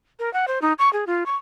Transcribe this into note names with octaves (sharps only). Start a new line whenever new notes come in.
A#4
F#5
C5
D#4
C#6
G#4
F4
C#6